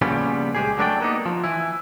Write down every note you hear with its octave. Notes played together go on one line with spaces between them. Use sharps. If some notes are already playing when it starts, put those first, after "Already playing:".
A#2 C#3 F3 G3 B3 C#4
C#2 G#3 G4 G#4
F#3 A3 D4 A#4 D5 G5
A#3 B3 D#4
F3
E3 E4